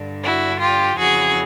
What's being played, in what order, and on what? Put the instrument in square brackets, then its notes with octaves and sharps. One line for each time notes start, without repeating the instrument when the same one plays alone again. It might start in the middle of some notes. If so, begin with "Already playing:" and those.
Already playing: [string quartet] G2 D3
E4 F#4
F4 G4
F2 C#3 E3 F#4 G#4